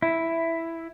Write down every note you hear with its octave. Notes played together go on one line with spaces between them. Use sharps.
E4